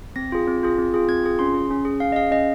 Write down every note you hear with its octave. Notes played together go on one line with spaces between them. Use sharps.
C4 A#6
F4 G#4
C4
F4 G#4
C4
F4 G#4
C4 G#6
F4 G#4
C#4 C6
G#4
C#4
G#4
C#4 F5
D#5
G#4 F5
C#4 D#5